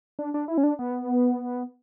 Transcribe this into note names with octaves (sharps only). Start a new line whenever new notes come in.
D4
D4
E4
C#4
D4
B3